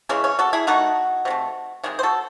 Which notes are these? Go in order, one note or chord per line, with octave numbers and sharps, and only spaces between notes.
C#3 E3 G#3 C#4
C#4
F#4 A4
E4 G#4
D#3 A3 D#4 F#4
C3 E3
A3
C3 D#3 G#3 G#4
C5
F#4 A4